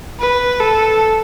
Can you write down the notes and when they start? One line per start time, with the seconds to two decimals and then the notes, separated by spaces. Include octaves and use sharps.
0.20 B4
0.60 A4